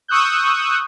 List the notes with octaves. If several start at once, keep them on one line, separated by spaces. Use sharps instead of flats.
C#6 D#6 E6 F#6 G6